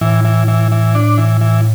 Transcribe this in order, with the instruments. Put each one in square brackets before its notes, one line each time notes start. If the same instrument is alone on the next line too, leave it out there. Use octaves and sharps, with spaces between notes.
[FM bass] A2 [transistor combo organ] E3
[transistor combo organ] E3
E3
E3
D4
E3
E3